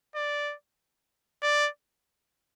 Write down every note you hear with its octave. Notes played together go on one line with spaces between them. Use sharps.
D5
D5